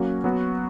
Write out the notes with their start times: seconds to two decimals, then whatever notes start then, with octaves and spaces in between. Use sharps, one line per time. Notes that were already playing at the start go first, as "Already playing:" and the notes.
Already playing: F#3 A#3 C#4 F#4
0.24 F#3 B3 F#4